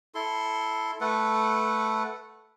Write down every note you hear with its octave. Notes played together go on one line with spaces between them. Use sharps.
E4 A4 C6
A3 A4 B4 F#5